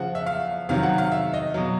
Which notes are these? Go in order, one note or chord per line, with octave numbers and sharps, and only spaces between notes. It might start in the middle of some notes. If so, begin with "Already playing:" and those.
Already playing: C#3 F3 F#5
E5
F5
C3 D#3 F#3 F5
F#5
F5
E5
D#5
B2 F#3